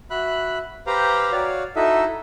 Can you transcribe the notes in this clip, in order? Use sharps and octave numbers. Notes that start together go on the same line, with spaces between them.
F#4 E5 B5 F#6
G4 B4 C5 F5 G5 A#5
F#4 C#5 D5 F5
D#4 E4 F#4 A4 D#5 E5